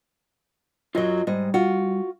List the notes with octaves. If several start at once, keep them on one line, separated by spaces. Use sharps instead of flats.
F#2 F#3 F4 F#4 D#5
G#2 G3 D#5
F4 F#4